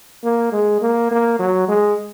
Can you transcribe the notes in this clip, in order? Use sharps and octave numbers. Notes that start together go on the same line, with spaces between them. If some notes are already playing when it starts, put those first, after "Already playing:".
A#3
G#3
A#3
A#3
F#3
G#3